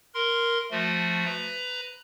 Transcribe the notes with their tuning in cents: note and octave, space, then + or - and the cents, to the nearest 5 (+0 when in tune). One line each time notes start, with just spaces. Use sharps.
A#4 +0 C6 -10
F3 +0 A3 +0 F#4 -15
B4 +15 A#5 +0